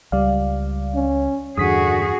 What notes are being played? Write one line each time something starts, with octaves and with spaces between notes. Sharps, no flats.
C#2 G3 D5 F5
C#4
E2 G2 D3 F#4 G#4 D#6 B6